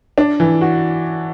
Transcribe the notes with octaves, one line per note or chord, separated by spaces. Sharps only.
D4
E3
F#4